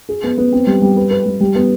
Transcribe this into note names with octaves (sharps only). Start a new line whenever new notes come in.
G#4
B3
B3
C4
G3
G3
B4
B4
G3
G3
B3